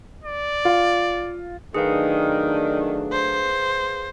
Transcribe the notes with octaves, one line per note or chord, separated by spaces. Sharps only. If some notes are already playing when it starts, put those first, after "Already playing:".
D5
F4
D#3 F#3 A3 D4 G#4 B4 F5
C5